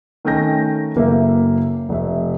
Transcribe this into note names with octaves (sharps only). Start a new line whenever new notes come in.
D#3 A3 C#4 G5 G6 A#6
F#1 A#3 A4 E5
F1 E5